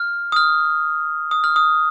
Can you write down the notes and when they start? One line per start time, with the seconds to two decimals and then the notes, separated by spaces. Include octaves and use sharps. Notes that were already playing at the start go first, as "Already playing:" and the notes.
Already playing: F6
0.32 D#6
0.36 F6
1.31 D#6
1.44 F6
1.56 D#6